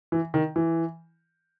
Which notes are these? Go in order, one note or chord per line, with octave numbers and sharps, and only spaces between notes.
E3
D#3
E3